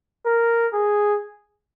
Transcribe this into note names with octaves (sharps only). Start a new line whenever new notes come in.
A#4
G#4